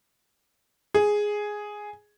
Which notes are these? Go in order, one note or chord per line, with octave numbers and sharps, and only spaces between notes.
G#4